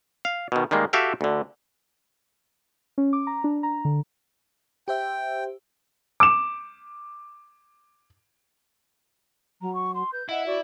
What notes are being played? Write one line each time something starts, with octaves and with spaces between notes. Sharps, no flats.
F5
B2 D#3
D#3 G3 G#3 A#3
F#4 G4 A4 E5 F5 G5
D2 D3
C#4
D6
A#5
D4
A#5
D3
G4 C5 E5 G5
D6 E7
F#3 A#5
C#6
C6
B4 G6
E4 D#5 F#5
F#4 D5